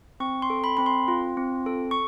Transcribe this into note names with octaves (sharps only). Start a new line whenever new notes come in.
C4 C#6
C6
A4
B5
C4 B5
C6
F4
C4
A4
C#6